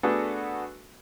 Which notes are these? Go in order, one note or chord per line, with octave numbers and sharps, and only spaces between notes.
A3 B3 D4 F#4 G#4 A4